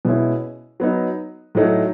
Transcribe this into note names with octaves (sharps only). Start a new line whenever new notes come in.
B2 G#3 C#4 E4
F#3 B3 D#4
A2 F#3 A3 D#4